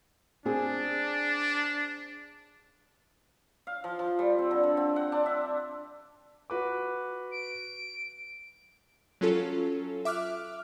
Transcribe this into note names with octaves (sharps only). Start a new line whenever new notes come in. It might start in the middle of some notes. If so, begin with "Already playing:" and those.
C4 D4 G#4
F5
F3
F3
G3
C4
D3
D3
C4
F#5
D4
E5
F#4 B4 D6
D7
F#3 C#4 F4 A4
E5 D6 F6 F#6